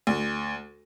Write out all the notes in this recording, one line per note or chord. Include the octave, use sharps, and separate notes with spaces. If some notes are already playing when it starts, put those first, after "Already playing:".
D2